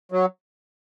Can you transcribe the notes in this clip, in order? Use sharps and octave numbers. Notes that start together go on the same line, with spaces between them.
F#3